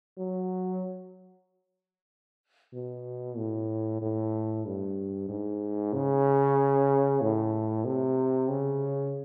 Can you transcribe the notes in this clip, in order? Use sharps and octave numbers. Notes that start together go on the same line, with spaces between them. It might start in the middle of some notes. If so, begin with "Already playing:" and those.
F#3
B2
A2
A2
G2
G#2
C#3
A2
C3
C#3